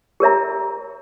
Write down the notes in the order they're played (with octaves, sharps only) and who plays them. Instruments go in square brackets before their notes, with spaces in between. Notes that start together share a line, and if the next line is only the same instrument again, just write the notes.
[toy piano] G4 A#4 C#5 E5 A#5